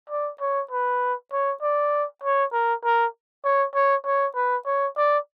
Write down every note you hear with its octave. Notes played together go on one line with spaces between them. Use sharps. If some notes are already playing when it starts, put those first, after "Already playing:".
D5
C#5
B4
C#5
D5
C#5
A#4
A#4
C#5
C#5
C#5
B4
C#5
D5